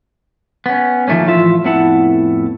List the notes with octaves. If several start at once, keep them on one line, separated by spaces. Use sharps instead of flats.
B3 C#4
D#3 F3 A3 A#3 C#4
A2 E3 F3 F4 E5
F2 A2 B3 E4 F#5 A5